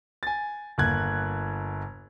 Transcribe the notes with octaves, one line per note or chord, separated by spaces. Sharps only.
G#5 A6
G1 A#3 F#6 G#6